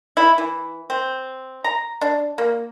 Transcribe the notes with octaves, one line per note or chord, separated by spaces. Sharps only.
E4
E3
C4
A#5
D4
A#3